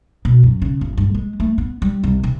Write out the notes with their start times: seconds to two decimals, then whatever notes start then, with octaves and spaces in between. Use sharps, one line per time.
0.25 B2
0.43 F#2
0.62 C#3
0.81 G1
0.97 G2
1.15 G#3
1.40 A3
1.58 B3
1.82 G3
2.03 C2
2.23 C3